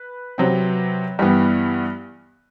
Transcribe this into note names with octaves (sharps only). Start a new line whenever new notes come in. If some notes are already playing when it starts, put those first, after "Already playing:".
Already playing: B4
C3 F#3 C4
G2 E3 B3 G4